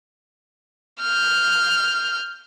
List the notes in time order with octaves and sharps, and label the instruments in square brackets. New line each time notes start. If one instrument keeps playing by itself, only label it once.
[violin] F6 G6